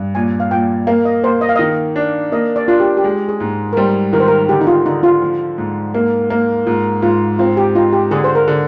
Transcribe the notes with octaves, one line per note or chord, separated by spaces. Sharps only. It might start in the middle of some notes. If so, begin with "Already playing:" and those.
Already playing: G2
A#2 G#5
F5
A#2 G5
A#3 F5
D#5
A#3 C5
D#5
F5
D#3 D#5
D4
A#3 D#5
D5
D4 F4
G4
G4
G#3 G#4
G#4
G#2
A#4
G3 C5
D#3 A#4
C5
A#4
D3 G4
D#4
F4
D3 D#4
F4
F3
G#2
A#3
A#3
G#2 F4
G#2 F4
C4 F4
G4
D#4 F4
G4
D3 G#4
C5
A#4
D3